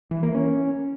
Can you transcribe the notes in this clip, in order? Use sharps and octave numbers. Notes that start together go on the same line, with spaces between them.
E3
A#3
C#4